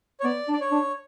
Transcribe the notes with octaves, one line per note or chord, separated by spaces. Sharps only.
C#5
B3 D5
D4
D5
C#5
D4